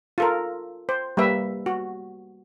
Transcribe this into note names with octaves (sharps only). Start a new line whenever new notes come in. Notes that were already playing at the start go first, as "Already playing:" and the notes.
F4 A4 A#4
C5
G3 A#3 B4 E5
F#4